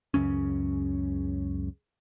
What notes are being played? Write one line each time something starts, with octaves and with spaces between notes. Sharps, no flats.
C#2 F#2 C#3 C#4